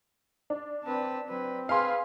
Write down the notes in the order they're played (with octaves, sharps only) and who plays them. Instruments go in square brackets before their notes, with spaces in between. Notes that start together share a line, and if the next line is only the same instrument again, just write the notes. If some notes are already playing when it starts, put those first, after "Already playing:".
[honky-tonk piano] D4
[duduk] C4 [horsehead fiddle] B4 A5
[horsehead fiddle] F#3 B4 [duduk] C4
[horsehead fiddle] G#4 B4 [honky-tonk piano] F5 G#5 C6